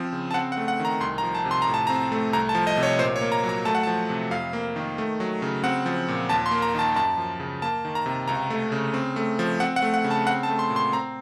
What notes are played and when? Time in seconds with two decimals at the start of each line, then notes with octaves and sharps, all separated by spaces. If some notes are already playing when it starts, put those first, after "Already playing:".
Already playing: F3 C4
0.13 C#3
0.31 A5
0.34 C4 F#5
0.52 F#5
0.57 A3
0.68 F#5
0.80 D#3
0.85 A#5
1.00 C2 C6
1.18 A#5
1.23 F3
1.35 A5
1.45 C3
1.51 C6
1.62 A2 A#5
1.74 A5
1.87 C4 A#5
2.12 A3
2.33 C2 A#5
2.49 A5
2.55 F3
2.67 D#5
2.77 C3
2.83 C#5
2.99 A#2 C5
3.16 C#5
3.21 A#3
3.32 A#5
3.43 F#3
3.49 A#5
3.65 A3 A5
3.75 F#5
3.83 F3 A5
4.10 C3
4.31 F2 F5
4.53 A#3
4.76 D#3
4.98 A3
5.20 F#3
5.42 C#3
5.64 C4 F#5
5.86 F3
6.08 A#2
6.29 D#2 A5
6.46 C6
6.51 A#3
6.62 A#5
6.75 D#3 A5
6.96 F#2 A5
7.17 F3
7.40 C#3
7.62 A#3 A5
7.85 D#3
7.95 A#5
8.06 C3
8.28 C#2 A#5
8.50 A3
8.72 C#3
8.94 C4
9.16 A3
9.39 F3
9.60 C4 F#5
9.76 F#5
9.82 A3
9.94 F#5
10.04 C#3
10.11 A5
10.27 C4 F#5
10.43 A5
10.48 A3
10.59 C6
10.70 A#2
10.76 C6
10.92 C4 A#5